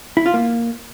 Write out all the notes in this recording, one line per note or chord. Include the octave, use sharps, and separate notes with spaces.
E4
F4
A#3